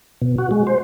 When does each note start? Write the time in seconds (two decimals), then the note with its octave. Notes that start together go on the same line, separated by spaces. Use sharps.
0.22 B2
0.38 F#4
0.51 G#3
0.67 C5